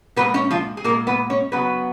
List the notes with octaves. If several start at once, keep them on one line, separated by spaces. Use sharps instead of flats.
A#2 G#3 B3 B4
C#4 C#5
F3 F4
G#4
A#2 A#3 A#4
G#3
B3 B4
C#4 C#5
C#3 F#3 B3 B4